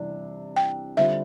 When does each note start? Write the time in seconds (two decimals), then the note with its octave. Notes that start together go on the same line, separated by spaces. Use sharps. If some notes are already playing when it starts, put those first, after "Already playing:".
Already playing: C3 E3 G3 D4
0.56 G5
0.97 D3 G3 C4 F4 E5